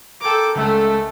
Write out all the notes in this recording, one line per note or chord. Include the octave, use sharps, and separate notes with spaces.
A4 A#4 G5 D6
C#2 C#3 G#3 A3 A4